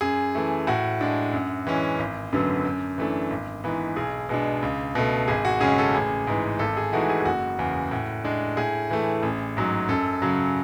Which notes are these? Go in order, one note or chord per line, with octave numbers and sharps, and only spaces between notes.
F#2 G#4
E3 A3
A2 F#4
G#3 D4
F#2
E3 G#3 C#4
G#1
F#2 D3 F#3 B3
F#2
E3 A3 D4
G#1
G#2 E3 B3
B1 G#4
B2 G#3 D4
C#2
B2 A3
G#1 G#4
F#4
F#2 C#3 G#3 C#4 G#4
A4
A1 G#4
G#2 E3
G#1 A4
G#4
G#2 E3 A3 F#4
G#4
G#4
F#1 F#4
E2 C#3
A2
G#3 D4
A2 G#4
E3 A3
A1
G#2 F#3
F#2 A4
C#3 F#3